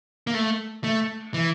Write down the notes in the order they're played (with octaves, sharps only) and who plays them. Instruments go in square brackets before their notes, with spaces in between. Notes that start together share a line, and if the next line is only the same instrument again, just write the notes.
[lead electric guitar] A#3
A3
A3
E3